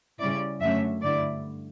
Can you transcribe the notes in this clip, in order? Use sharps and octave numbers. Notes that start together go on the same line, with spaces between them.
C#3 G3 C#4 E4 D5
F#2 D3 F#3 A3 C#4 E5
G2 D3 A3 E4 D5